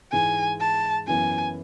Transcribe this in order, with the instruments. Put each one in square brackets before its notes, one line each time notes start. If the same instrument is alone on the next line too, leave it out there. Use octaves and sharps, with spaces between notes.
[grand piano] G#2 E3 G#3 [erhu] G#5
[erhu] A5
[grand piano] F#2 E3 B3 [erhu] G#5